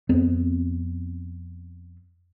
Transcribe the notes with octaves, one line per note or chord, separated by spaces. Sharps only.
F2 B3 C4